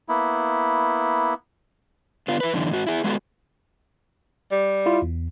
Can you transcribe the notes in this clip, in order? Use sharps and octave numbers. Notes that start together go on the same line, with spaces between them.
A#3 B3 E4
D3 B3 F4
E4 B4
F#2 D3 E3
G#2 F#4
E4 G#4
G#3 B3 F#4 A4
G3
E4 F4
E2